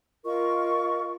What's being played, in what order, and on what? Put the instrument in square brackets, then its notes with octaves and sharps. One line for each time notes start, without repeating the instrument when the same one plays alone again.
[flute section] F4 A#4 D#5 C#6